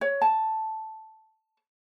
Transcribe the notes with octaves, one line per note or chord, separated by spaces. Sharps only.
C#5
A5